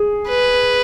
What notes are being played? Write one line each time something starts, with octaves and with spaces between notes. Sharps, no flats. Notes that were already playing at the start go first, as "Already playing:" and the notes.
Already playing: G#4
B4